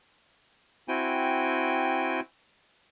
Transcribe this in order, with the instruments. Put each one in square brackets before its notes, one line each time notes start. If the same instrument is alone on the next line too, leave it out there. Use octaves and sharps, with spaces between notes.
[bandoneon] C4 E4 F#4 G5 G#5